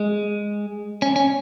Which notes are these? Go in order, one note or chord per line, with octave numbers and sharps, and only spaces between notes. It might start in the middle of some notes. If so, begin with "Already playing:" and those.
Already playing: G#3
C#4
C#4